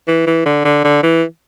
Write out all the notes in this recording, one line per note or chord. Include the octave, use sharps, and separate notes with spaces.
E3
E3
D3
D3
D3
E3